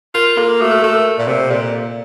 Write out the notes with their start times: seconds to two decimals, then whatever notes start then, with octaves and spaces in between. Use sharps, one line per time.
0.14 F4 A#4
0.37 A#3 A4
0.61 A3 F#4
0.71 A4
0.82 A3 A4
0.94 A#4
1.19 A#2
1.27 C3
1.50 A#2 A4